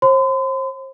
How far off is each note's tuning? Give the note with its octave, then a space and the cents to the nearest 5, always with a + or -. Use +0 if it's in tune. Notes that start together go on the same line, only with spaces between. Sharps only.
C5 +35 C6 -45